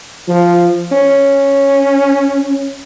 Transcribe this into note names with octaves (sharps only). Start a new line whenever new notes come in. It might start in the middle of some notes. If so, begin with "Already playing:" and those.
F3
C#4